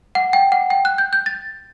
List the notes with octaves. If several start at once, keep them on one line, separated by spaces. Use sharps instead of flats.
F#5
G5
F#5
G5
F#6
G6
G6
A6